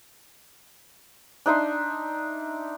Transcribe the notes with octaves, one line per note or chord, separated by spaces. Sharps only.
D4 D#4 E5 C6